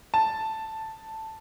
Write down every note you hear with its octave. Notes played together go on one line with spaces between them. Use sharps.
A5